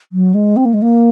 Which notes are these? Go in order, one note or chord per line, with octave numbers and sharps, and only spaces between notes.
F#3
G#3
C4
A#3
G#3
A#3